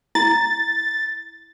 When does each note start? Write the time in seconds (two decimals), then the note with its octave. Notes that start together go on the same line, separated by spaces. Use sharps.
0.15 E4 A6